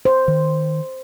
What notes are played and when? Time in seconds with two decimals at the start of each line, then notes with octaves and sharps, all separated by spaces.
0.05 C5
0.28 D#3